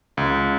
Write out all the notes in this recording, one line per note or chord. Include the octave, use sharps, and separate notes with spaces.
C#2